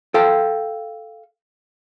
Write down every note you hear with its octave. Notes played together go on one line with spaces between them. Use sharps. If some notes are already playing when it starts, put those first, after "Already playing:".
A4 F5 G5